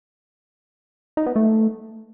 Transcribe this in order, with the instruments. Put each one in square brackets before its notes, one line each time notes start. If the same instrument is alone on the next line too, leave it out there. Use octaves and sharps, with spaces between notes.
[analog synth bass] D#4
B3
A3